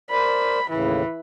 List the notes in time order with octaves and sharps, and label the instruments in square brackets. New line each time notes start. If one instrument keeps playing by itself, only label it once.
[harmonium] A#4 C5 D5 [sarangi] B5
[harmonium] D#2 A2 C#3 [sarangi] E3